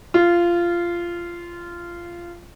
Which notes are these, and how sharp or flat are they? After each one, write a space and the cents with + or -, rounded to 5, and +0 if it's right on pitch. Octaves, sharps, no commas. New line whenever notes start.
F4 -15